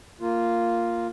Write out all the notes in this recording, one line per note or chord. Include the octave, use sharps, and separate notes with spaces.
A#3 F4